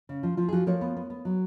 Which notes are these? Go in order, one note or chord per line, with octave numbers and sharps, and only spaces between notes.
C#3
F3
F3 F4
G#4
F3 F#4
F3 A#4 C#5
B3
B3
B3
F#3